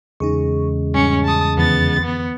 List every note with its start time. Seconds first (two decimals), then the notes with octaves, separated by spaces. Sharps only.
0.20 E2 C#3 G#3 D#4 G#4 C#6
0.94 G#2 G3 C#4 C#7
1.25 A5 D#6
1.57 F2 D3 E3 B3 A6
2.05 B3